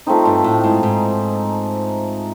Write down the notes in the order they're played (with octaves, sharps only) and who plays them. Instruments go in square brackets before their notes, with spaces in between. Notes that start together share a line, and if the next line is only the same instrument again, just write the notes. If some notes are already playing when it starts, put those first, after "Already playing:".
[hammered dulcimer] F3 A3 C4 D#4
[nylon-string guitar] G2
A2
G#2
G#2